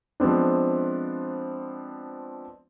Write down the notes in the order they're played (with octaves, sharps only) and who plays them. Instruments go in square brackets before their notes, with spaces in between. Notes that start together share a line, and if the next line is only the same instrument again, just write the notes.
[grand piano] F3 G#3 B3 C4 D4